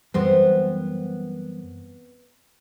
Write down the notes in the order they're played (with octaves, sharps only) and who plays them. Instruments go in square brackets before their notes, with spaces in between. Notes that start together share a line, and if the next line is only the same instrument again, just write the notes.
[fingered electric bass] F#2 E3 G3 [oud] B3 C4